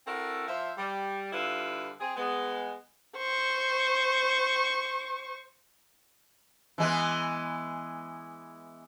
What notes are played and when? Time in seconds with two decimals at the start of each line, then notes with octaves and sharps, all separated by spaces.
0.07 C4 E4 F#4 A4 A#4
0.48 F3 C5 E5
0.78 G3
1.33 D3 G3 E4 F4 B4
2.00 C4 G#4
2.17 G#3 B3
3.17 C5 C#6
6.78 E3 G#3 B3